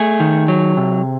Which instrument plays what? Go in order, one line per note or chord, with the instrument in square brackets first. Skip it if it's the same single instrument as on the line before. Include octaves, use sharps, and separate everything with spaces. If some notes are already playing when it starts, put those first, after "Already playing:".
Already playing: [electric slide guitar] A3 G#4
D#3
F#3
C3